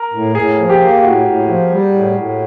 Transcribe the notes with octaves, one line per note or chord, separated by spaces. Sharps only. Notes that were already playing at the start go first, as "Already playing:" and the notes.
Already playing: A#4
A2
A2 G#4
F3
G4
A#3
A2 F#4
A2
F3
G3
A2
A2